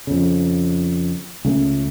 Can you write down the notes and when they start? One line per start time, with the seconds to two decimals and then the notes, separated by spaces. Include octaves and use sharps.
0.07 F2 C#3
1.45 C#2 C#3 A3